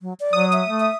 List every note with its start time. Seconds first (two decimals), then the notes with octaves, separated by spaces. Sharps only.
0.01 F#3
0.20 D5
0.33 F#3 D#6
0.53 E5
0.68 A3
0.80 E5